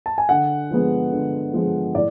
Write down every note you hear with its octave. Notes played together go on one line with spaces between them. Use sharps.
A5
G#5
D3 F#5
F3 G#3 B3
D3
F3 G#3 B3
A2 D5